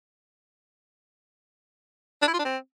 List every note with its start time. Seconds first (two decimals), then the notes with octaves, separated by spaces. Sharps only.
2.22 D4
2.28 E4
2.33 F4
2.39 D4
2.45 C4